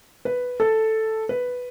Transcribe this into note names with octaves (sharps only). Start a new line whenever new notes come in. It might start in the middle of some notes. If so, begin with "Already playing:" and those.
B4
A4
B4